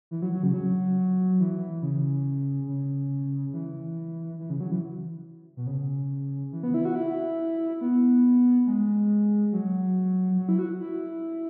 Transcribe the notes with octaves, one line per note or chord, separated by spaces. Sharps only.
E3
F#3
F#3
C#3
F#3
E3
C#3
C#3
E3
E3
C#3
F#3
E3
B2
C#3
E3
B3
E4
F#4
E4
B3
G#3
F#3
F#3
E4
F#4
E4